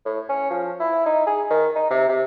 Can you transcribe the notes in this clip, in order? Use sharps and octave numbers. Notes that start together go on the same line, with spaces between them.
A2
C#4
F3
E4
D#4
G#4
D#3
D#4
C3
C3